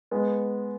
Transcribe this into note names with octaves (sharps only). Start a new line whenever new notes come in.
G#3 B3